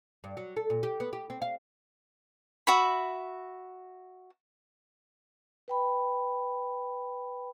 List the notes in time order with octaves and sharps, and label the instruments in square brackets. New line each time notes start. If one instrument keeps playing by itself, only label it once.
[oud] G2
F#3
A4
A#2
G4
B3
G4
C4
F5
[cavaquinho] F#4 E5 B5
[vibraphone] B4 G5 B5